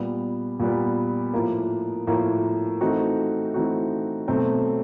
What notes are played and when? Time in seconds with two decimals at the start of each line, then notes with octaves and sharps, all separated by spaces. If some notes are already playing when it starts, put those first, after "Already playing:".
Already playing: A#2 G3 B3
0.60 A#2 G3 B3
1.34 A2 F3 A#3
2.07 A2 F3 A#3
2.81 E3 A3 C4 D#4 F#4
3.54 E3 A3 C4 D#4 F#4
4.28 B2 F#3 A3 C4